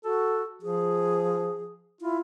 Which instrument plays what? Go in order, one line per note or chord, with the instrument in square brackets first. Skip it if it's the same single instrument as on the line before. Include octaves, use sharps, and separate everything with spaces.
[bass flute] F#4 [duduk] A4
[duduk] F3 [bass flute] G#4
[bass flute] E4 [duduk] F4